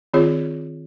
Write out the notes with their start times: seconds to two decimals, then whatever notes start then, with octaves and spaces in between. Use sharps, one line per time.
0.14 D#3 C4 F4 G#4 C#5